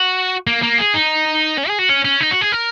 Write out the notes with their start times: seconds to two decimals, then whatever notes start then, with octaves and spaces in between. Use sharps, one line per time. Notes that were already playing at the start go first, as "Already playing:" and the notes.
Already playing: F#4
0.47 A#3
0.63 A#3
0.79 G#4
0.95 D#4
1.58 C#4
1.68 G#4
1.79 F#4
1.89 C#4
2.05 C#4
2.20 D#4
2.31 F#4
2.41 G#4
2.52 A#4